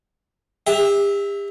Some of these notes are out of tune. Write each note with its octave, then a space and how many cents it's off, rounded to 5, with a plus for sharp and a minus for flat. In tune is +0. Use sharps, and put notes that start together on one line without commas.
G4 +40 E5 -15